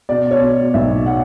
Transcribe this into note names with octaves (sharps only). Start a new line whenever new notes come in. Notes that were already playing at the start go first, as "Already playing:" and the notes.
B2 D5
C#5
B2
B1 E5
F#5